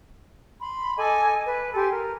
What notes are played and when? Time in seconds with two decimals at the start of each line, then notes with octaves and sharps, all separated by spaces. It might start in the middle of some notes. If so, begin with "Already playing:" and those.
0.60 B5 C6
0.97 A4 D#5 G#5 D6
1.47 B4
1.74 G4 A4 G#5 C6
1.89 A#4